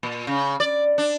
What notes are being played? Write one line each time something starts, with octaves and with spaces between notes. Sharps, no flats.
A#2
C#3
D5
D4